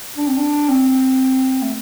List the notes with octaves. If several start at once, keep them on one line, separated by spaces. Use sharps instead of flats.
D4
C4
D4
C4
A3